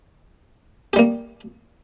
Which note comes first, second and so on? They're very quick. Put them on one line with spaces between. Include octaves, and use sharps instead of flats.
G4 G3 A#3